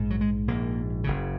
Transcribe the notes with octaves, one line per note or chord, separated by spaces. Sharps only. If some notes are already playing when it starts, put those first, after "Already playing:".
Already playing: A#1 G#2
F#3
G#3
A#1 G#2 A#3
F#1 F#2 C#3